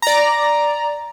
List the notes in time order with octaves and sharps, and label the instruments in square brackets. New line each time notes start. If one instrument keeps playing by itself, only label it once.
[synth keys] D5 A#5